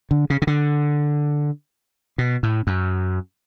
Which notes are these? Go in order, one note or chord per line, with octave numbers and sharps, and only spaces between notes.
D3
C#3
C#3
D3
B2
A2
F#2